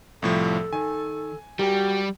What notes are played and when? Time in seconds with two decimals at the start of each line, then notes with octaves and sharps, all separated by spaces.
0.22 C2 A2 F3 A4
0.73 D#3 G#5
1.59 G3 F#4 G4 A#4